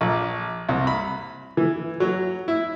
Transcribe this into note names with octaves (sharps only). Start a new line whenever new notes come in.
A#1
C2
B5
E3
F#3
E4